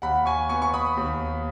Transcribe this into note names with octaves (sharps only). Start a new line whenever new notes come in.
D#2 F#5 B5
G#5 C#6
B3 G#5 C#6
C#6
B5 D#6
D#2